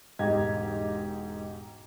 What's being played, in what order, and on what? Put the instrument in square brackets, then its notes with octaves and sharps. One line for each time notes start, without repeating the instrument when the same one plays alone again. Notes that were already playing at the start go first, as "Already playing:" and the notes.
[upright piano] E1 G#2 G4 D#5 G#6